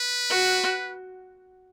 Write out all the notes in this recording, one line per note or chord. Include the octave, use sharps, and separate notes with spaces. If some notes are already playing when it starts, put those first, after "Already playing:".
Already playing: B4
F#4